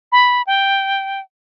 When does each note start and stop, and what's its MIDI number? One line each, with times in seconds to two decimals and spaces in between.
0.12 0.42 83
0.47 1.21 79